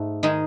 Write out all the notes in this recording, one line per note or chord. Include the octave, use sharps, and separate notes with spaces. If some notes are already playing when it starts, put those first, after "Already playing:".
Already playing: G#2 A3
D#3 G#3 D#4 G#4